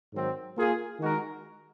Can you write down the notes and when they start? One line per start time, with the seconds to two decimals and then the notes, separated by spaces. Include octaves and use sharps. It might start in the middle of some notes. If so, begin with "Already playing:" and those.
0.13 G#2 D#3 F#3 C4
0.57 A#3 F4 G#4
1.00 D#3 G#3 D#4 F#4 A#4